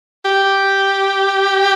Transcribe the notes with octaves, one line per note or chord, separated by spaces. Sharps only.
G4